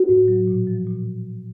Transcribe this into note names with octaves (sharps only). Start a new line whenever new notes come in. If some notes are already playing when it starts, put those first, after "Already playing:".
Already playing: F#4
A2
F#3
A#2
F3
A#2